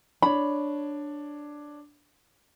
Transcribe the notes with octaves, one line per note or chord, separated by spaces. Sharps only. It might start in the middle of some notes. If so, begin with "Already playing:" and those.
D4 C#5 B5